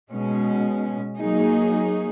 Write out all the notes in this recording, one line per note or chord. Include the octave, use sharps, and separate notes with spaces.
B2 G#3 C#4
F#3 A#3 D#4 G#4